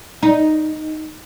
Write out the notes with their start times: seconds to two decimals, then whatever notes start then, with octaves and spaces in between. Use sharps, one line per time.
0.23 D#4